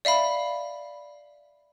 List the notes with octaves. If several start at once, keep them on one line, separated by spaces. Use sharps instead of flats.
D5 E5 F5 B5